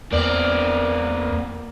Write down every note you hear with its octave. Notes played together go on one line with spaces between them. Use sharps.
E2 E3 A#3 C4 D5